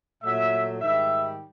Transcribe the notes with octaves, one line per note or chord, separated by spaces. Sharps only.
A#2 F#3 A3 E5
G#2 D#3 G3 E5